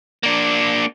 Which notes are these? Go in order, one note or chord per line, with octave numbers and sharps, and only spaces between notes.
A#3 D4